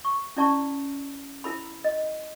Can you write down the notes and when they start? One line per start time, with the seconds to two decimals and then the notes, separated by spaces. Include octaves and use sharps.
0.05 C#6
0.36 C#4 E4 D5 A5 A#5 C#6
1.44 E4 A#4 B5
1.84 D#5